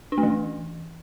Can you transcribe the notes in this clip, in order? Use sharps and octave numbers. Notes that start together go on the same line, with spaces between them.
D4
A3
E3